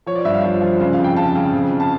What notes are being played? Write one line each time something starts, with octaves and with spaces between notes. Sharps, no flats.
F3 C#5
D5
G2 E5
F5
F3
F3
C#3
F5
F2
G5
C#3 A5
C#3
F2
F2
A5